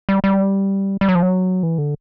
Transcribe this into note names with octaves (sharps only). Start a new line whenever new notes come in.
G3
G3
G3
F#3
F3
F#3
E3
D3